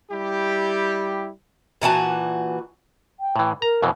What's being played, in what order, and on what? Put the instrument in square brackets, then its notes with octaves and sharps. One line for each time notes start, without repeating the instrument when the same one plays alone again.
[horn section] G3 E4 G4
[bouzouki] A#2 E3 F#4 A5
[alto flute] G5
[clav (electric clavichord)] A2 E3
[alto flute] A#4 [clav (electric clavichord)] A#5
[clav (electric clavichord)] F2 B2 E3